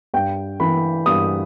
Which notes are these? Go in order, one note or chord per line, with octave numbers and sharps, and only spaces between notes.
G2 G5
E3 B5
G2 D#6